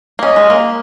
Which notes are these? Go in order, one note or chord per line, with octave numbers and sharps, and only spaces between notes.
A#3
C#4 D#5
G#3
A#3